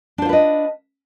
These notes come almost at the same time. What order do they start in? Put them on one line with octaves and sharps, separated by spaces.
D4 C5 F4 B4 D#5